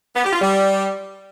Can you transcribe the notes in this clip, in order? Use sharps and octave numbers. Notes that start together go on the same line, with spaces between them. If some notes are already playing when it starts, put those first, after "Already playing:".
B3
G4
F4
G3